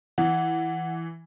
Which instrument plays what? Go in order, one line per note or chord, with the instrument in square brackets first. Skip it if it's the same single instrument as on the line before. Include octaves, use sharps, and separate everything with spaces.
[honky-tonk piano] E3 [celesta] F#5